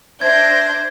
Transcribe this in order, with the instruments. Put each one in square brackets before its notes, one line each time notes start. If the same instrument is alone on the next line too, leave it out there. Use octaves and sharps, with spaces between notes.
[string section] D4 C5 [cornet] E5 [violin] G6 A#6 [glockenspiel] G#6